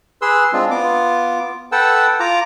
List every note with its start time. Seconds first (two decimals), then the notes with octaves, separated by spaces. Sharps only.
0.22 G#4 B4 C6 E6
0.53 G#3 C4 D4 F4
0.71 B3 F4 D6
1.72 A4 B4 F#5 G5 A5 E6
2.20 F4 A#5 D6